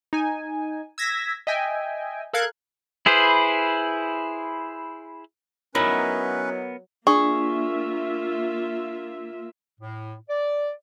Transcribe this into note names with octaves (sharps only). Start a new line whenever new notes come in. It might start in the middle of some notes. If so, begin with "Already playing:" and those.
D#4 G#5
E6 G#6 A#6 B6
D#5 E5 G5 G#5
A4 A#4 F5 F#6 G#6
E4 G#4 B4 C5
F#3 B3 C#4 D#4 E4 A#4 B4 B5
A#3 D4 F4 G#4 E5 C#6
A2
D5